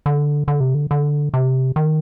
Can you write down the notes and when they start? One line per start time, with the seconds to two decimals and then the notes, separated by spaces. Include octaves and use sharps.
0.06 D3
0.48 D3
0.60 C3
0.74 D3
0.91 D3
1.34 C3
1.76 D#3